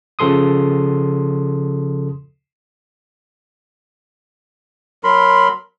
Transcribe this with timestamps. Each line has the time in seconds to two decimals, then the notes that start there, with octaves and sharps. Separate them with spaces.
0.19 C#3 F3 A4 C6 D#6
5.04 F#3 A#4 B5 C6